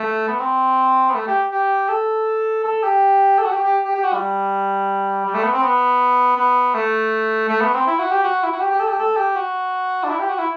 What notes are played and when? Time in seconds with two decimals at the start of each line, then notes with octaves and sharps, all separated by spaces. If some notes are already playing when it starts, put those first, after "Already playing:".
Already playing: A3
0.27 B3
0.39 C4
1.09 B3
1.15 A3
1.27 G4
1.51 G4
1.89 A4
2.64 A4
2.83 G4
3.38 A4
3.45 F#4
3.51 G4
3.64 G4
3.84 G4
3.95 G4
4.04 F#4
4.13 G3
5.25 G3
5.34 A3
5.43 B3
5.53 C4
5.62 B3
6.36 B3
6.74 A3
7.49 A3
7.61 B3
7.74 C4
7.87 E4
7.99 F#4
8.11 G4
8.24 F#4
8.43 E4
8.52 F#4
8.61 G4
8.71 G4
8.79 A4
8.89 G4
8.99 A4
9.16 G4
9.36 F#4
10.03 D4
10.10 E4
10.19 G4
10.29 F#4
10.38 E4